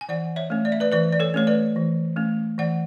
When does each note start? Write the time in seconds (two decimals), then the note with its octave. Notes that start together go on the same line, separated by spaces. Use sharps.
0.01 G#5
0.09 E3 D5 F#5
0.36 C#5 E5
0.50 A3 C#4
0.65 D5
0.72 E5
0.80 B4 D5
0.92 E3 B4 D5
1.13 D5
1.20 A4 C#5
1.34 A3 C#4 C#5
1.47 B4 D5
1.76 E3
2.16 A3 C#4
2.58 E3 D5 F#5